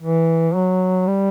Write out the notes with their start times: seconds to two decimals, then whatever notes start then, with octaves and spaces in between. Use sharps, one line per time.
0.02 E3
0.55 F#3
1.07 G3